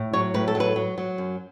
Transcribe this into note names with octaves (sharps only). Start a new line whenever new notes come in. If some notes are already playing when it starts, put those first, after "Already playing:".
Already playing: A2
F#3 C#5
A2 B4
A4
F#3
B4
F#3
F#3
F#2